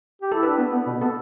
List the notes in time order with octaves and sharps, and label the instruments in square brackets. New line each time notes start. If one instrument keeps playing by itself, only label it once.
[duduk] G4
[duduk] E4 [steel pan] A4
[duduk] D4 [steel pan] B4
[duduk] B3
B3
B2
[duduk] B3 [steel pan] A4